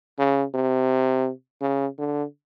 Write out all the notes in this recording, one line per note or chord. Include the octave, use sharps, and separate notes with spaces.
C#3
C3
C#3
D3